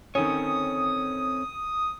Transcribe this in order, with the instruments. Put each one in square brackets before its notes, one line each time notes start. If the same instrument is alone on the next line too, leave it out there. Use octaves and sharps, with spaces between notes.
[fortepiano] D#3 C#4 [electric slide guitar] C4 A4 C#5 [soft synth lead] D#6